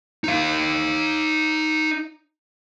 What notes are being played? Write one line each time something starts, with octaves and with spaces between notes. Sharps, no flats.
D#4 F5